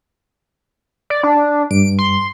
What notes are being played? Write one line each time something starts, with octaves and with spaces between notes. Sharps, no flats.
D5
D4
G2 D7
C6